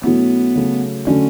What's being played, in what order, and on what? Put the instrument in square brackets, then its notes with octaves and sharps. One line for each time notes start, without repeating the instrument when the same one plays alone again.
[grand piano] B2 F#3 A3 C#4 E4 [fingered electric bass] B3
[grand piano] C#3 F#3 A3
[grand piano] D3 F#3 A3 D4 [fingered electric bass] C#4